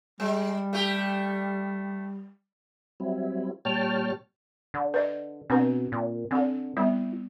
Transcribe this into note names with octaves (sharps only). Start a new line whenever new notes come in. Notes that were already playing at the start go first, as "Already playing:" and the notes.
G3 G#3
A3 G4
F#3 G3 C4 E4
A#2 G3 C#5 G5 A5 F6
D3
B4 D5 D#5
B2 C4 D4 B4
A#2
D3 C4 A4
G3 B3 E4